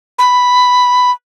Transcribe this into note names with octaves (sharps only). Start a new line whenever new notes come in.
B5